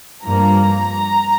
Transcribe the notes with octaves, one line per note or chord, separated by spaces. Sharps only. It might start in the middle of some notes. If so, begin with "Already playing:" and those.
G2 F3 A#3 A#5